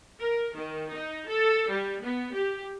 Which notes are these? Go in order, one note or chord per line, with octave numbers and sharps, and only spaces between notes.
A#4
D#3
D#4
A4
G3
B3
G4